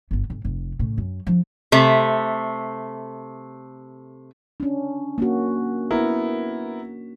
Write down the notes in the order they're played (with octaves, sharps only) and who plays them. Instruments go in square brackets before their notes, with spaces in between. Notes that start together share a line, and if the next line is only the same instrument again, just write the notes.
[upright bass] G1 B3
G1
F1
A2 C#3
F#2
F3 D4
[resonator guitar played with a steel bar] C3 A3
[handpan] C#4 D4
A#3 C#4 F#4
[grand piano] B3 E4 A#4